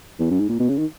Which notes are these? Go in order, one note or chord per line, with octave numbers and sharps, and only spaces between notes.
E2
F#2
G#2
A#2
B2
C#3
D#3